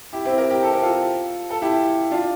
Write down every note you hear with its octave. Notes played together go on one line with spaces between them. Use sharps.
E4 G4
C4 E4
G4 A#4
G4 A#4
A4
A#4
F4 A4
A4
E4 G4
D4 F4